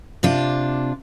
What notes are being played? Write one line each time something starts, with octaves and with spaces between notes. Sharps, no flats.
C3 D4 F4